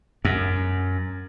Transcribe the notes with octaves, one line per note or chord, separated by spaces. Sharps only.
F#2